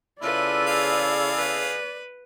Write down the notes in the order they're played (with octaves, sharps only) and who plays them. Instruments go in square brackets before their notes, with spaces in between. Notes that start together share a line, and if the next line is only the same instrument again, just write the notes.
[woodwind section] C#3 E4 A4 [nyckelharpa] F4 B4 [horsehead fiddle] D5
[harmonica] G#4 F5
[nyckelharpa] B4